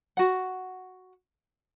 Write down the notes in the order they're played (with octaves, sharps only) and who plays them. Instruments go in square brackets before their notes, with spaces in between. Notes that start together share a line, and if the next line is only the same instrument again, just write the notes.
[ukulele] F#4 F#5